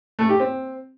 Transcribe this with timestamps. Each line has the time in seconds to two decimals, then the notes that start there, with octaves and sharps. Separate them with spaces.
0.19 A3
0.29 G4
0.40 C4